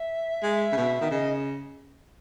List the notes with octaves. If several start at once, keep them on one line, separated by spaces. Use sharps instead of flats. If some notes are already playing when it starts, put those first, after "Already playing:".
Already playing: E5
G#3
C#3
B2
D#3
C#3 D#5